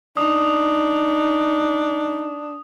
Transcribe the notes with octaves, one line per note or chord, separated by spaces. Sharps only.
D4 D#4 D#6